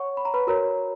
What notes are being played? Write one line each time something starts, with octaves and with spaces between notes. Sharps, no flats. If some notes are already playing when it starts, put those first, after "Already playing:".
Already playing: C#5 F#5 C#6
B5
A#5
B4 B5
F#4 A#4 C#5 A#5